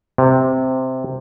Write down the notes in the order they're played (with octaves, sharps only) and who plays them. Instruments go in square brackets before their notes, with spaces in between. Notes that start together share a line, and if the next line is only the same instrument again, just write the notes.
[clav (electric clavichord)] C3